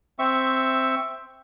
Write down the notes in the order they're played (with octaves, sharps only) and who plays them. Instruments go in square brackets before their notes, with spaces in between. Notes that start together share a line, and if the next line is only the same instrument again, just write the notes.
[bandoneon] C4 E5 C#6